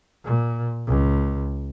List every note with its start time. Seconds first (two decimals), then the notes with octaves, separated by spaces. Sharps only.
0.24 A#2
0.87 C#2